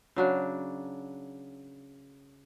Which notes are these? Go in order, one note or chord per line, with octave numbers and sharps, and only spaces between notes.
C#3 F#3 D4